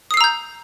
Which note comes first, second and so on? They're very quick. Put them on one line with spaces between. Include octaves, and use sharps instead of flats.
D#6 C7 E6 A#5 G6